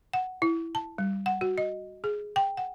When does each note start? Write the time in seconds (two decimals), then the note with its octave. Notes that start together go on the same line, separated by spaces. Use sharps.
0.13 F#5
0.42 E4
0.75 A5
0.98 G3
1.26 F#5
1.41 F#4
1.58 D#5
2.04 G#4
2.36 G5
2.57 F#5